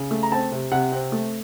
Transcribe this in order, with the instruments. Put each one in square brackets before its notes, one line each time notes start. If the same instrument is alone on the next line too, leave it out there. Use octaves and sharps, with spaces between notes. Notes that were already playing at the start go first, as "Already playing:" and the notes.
Already playing: [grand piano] C#3
A3
A#5
C4 A5
C3
C3 F#5
C4
A3